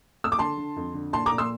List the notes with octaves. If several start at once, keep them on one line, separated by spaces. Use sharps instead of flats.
E6
D6
D3 A5 C6
D3
F2
D3
A#2 A5 C6
A#5 D6
A#2
C6 E6